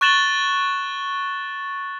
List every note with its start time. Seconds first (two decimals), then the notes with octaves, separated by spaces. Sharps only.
0.01 C#6 F#6 A6 E7 F#7 G7